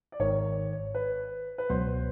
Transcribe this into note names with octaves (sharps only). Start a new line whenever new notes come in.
D5
G#1 G#2 D#3 C#5
B4
B4
C#2 B2 F#3 B3 C5